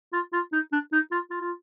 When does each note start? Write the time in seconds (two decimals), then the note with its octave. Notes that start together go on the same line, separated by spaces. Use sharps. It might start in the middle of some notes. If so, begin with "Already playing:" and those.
0.13 F4
0.33 F4
0.52 D#4
0.72 D4
0.92 D#4
1.11 F4
1.31 F4
1.41 F4